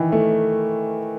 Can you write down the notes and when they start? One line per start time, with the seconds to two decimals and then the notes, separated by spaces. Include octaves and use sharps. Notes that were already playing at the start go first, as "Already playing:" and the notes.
Already playing: D#3 E3
0.12 A3